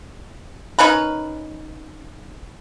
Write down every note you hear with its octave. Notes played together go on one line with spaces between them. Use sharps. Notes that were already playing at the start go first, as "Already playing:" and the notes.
C#4 D#4 A#4 B4